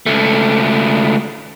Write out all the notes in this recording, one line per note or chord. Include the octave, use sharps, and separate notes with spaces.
C#2 A3